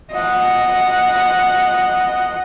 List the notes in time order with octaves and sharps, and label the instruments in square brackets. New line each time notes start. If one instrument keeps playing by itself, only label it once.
[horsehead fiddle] D#5 F#5